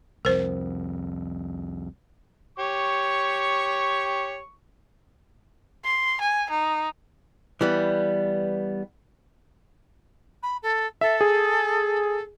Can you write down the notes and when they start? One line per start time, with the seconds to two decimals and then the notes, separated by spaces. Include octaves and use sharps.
0.25 C2 F2 A#4 C5
2.59 G4 C#5 C#6
5.84 C6
6.21 G#5
6.50 D#4
7.61 E3 G3 B3
10.43 B5
10.62 A4
11.01 A4 E5
11.21 G#4